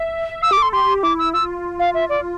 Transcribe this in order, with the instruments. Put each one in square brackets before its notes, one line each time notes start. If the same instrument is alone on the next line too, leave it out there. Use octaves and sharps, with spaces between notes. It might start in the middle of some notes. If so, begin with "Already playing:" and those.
Already playing: [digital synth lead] E5
[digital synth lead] F5 [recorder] E6
[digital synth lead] G4 [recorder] D6
[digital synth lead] A4
[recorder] C6
[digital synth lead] G4 [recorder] C6
[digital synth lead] E4 [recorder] D6
[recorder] E6
[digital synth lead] F4 [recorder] E6
[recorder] F5
E5
D5